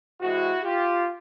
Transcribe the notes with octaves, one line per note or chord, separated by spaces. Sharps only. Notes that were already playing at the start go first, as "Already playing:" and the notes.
C3 E3 G#3 E4 F#4
F4 G4